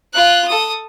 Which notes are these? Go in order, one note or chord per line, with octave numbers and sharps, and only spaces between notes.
F4 F#6
A4 D#6